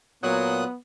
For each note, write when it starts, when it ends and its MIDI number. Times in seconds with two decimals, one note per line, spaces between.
0.23 0.64 46
0.23 0.65 54
0.23 0.77 59
0.23 0.64 87
0.23 0.64 90